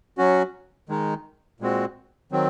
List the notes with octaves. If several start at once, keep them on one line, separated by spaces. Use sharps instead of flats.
F#3 C#4 F#4
D#3 G#3 D#4
A#2 G#3 C4 F#4
D#3 F#3 C4